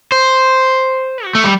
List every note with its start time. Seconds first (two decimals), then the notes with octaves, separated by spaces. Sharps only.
0.12 C5
1.25 F#4
1.35 A3
1.44 G3